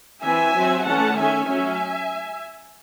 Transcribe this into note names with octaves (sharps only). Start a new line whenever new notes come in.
E3 C4 E5 G#5
F#3 C4
E3 A3 C#4 F#5 A5
D#3 A3 C#4 E5 G#5
F#3 C#4 E5 G#5